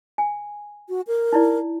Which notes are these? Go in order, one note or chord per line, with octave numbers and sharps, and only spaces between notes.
G#5
F#4
A#4
D#4 E4 D5